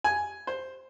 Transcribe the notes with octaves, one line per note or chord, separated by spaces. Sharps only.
G#5
C5